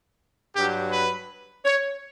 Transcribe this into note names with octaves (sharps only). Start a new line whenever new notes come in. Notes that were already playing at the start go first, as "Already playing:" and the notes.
G2 F#3 G4
B4
C#5